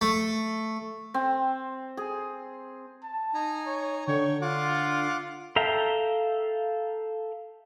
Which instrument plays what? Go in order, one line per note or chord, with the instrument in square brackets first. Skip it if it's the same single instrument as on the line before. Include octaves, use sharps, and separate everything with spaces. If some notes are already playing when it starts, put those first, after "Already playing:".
[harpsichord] A3
[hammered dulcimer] C4
G#4
[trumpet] A5
[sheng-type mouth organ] D#4 G#5 A#5
[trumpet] C#5
[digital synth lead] D3 [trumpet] C#5 [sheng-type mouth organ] G5 C#6
[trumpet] F4 [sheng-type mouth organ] F#5 D6
[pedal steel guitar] A4 E5 F5 G5 A#5